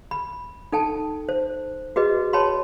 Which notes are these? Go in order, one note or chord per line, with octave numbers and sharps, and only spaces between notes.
B5
D#4 A4 G5 A5
C5
F#4 G#4 B4 D#5
C#5 G5 A5 B5 C6